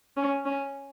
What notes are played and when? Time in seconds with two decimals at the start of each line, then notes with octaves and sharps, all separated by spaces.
0.17 C#4
0.45 C#4